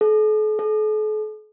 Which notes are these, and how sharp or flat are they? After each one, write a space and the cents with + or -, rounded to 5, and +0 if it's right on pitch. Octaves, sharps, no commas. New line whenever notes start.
A4 -45
A4 -45